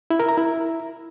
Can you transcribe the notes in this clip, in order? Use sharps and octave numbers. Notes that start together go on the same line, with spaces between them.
E4
A#4
A#5
E4